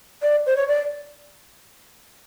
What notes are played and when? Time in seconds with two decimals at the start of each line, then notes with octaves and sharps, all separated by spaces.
0.22 D5
0.46 C5
0.57 C#5
0.68 D5